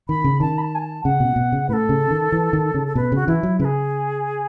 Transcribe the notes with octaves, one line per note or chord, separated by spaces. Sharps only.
D#3 B5
C#3
D#3 A5
B5
A5
G#5
A5
C#3 F#5
B2
B2
C#3
A2 A4 B4
C#3
D#3
E3
D#3
C#3
A4
B2 B4
C#3 F#4
E3 E4
F#3
C#3 B4
G#4